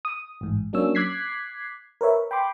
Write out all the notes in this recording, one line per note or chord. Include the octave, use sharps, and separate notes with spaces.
D#6
A1 G#2
F#3 A#3 C#4 D4 C#5 E6
D6 F#6 G#6 B6 C7
A#4 B4 C#5 E5
G5 B5 C6 D6